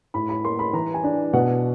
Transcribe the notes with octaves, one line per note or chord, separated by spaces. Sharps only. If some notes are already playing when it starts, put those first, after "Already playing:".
A2 B5
B5
A#3 C6
B5
E3 A#5
G#5
D4
B2 F#5